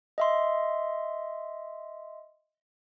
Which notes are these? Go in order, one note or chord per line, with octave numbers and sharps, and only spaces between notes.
D#5 E5 C6